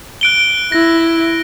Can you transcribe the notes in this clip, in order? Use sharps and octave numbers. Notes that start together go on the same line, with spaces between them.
F#6 D7 G7
E4 A#6